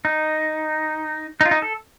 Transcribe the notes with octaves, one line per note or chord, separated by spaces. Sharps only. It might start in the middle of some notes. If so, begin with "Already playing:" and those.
D#4
D#4
F4
D#4
A4